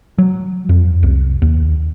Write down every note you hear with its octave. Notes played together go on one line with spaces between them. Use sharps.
F#3
F2
C2
D#2